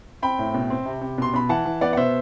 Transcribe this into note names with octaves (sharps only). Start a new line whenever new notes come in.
C4 G5 B5
A2
B2
C4
C3
C3
B2 C6
B2 B5
E3 F#5 A5
E3
B3 D5 F#5
F#5
B2 C5 E5